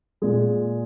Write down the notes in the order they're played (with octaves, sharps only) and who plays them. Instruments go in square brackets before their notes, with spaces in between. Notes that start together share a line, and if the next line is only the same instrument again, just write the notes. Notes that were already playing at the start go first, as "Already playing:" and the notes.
[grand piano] A#2 G#3 G#4